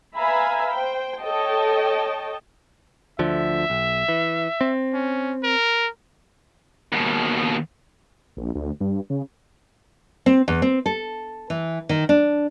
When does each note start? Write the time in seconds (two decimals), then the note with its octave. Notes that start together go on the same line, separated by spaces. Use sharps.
0.15 B4 E5 F5 G#5 A#5 B5
0.73 C5 G5
1.20 A4 C#5 D#5 G5 A5
3.19 D2 D3 F3 E5
3.70 B1
4.08 E3
4.61 C4
4.94 C#4
5.43 A#4
6.92 D#2 B2
8.37 A#1
8.55 D2
8.81 G2
9.10 C#3
10.26 C4
10.48 E2
10.62 C4
10.86 A4
11.50 E3
11.89 D#3
12.09 D4